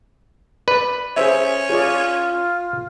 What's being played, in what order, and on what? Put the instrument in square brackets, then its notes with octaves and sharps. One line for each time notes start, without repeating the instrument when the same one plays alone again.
[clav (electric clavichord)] B4 [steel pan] D5 B5
[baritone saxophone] C#4 [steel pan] G#4 C5 E5
[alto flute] F4 [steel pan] G#4 C#5 D5